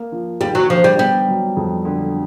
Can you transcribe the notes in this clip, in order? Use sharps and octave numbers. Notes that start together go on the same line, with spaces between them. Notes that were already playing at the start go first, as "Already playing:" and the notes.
Already playing: A#3
F3
D#2 G3
F#3
D3 F3
G3
G3 B3
F#3
F2
D3